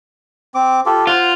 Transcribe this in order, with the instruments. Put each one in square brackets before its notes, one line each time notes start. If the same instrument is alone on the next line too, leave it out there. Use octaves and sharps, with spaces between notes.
[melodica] C4 D6
F4 G4 A4
[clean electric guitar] F4 [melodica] C5 F#5